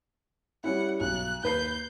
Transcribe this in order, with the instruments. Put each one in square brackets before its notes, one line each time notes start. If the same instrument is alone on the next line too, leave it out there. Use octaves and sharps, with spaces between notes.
[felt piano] G3 C#4 E4 [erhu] F#5
[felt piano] B1 [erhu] F#6
[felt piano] D#2 B4 C7 [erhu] G6